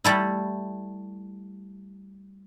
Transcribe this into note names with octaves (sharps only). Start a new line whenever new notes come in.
G3 A3 E4